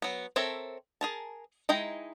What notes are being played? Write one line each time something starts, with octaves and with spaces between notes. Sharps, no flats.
F#3 B3
C4 A4 A#4 C#5 E5
G#4 A#4 A5
G#3 D#4 E4 G5 A#5